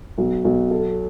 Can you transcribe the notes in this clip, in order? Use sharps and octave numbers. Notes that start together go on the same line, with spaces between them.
B1
B1
A4